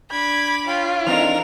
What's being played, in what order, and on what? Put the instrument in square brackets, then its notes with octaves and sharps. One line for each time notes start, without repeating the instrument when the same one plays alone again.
[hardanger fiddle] D4 [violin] B5 D6 [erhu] G#6
[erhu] F4 [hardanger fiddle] C#5 G5
[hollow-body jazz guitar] E3 C4 D#4 [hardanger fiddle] D4 A4 [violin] A#4 F7